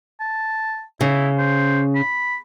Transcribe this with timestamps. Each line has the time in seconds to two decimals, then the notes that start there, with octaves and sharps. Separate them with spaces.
0.20 A5
1.01 C#3 E4
1.38 C5
1.95 B5